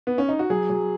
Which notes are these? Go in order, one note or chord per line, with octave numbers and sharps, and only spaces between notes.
B3
C#4
D#4
F#4
F#3 G#4
F#3